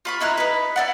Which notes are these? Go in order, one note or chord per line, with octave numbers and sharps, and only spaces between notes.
F4 B5 C#6
D#4 E4 A#4 F#6
D#4 B4
E4 D5 F#5